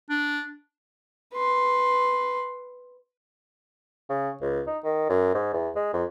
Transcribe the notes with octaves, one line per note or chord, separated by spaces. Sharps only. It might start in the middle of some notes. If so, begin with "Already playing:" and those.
D4
B4 C6
C#3
C#2
D#4
D#3
F#2
G#2
E2
G#3
F2